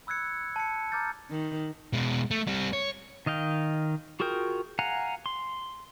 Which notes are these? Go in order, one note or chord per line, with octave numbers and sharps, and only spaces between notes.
B5 E6 F#6 G#6 C#7
A5 C#7
A#5 D6 F6 G6 A6
D#3
B2 G#3
A3
G3 C4
C#5
D#3 D#5 F5 G5
F4 F#4 G#4 A#4 G5
F5 F#5 G#5 A#5
C6